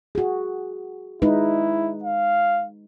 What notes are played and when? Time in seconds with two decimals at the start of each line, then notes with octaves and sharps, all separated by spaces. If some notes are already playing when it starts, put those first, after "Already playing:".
0.15 F#4 G#4
1.22 G#3 D#4 E4 B4
2.04 F5